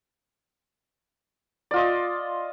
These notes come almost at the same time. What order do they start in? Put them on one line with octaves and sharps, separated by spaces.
D5 F4 D#5